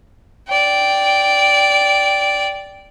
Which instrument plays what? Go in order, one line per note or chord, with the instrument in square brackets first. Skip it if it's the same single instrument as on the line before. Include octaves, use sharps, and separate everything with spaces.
[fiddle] D5 G5